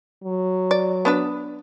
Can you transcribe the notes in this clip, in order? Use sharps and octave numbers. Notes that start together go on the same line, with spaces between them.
F#3
D5
B3 D4 B4